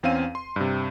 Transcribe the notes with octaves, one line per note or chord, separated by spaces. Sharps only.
E2 C4 C#4 F5 D#7
C6
G2 C3